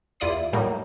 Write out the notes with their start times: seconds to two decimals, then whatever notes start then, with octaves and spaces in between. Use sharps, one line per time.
0.20 E2 E4 F4 D5 D#6 C7
0.53 A2 F#3 G3 A#3 D#4